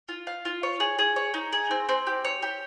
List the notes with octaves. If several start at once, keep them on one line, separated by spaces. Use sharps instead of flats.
F4
F5
F4
C#5
G#4
G#4
C#5
D#4
G#4
C4
C4
G4
C#5
G4